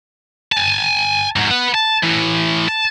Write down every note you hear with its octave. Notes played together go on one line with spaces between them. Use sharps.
G#5 A5
G#2 F#3
B4 F#5
A5
A2 E3
A5